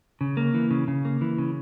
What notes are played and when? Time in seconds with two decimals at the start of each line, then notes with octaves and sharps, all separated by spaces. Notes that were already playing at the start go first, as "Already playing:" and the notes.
0.21 C#3
0.37 A#3
0.54 E3
0.71 C#3
0.88 C#3
1.05 A#3
1.21 E3
1.38 C#3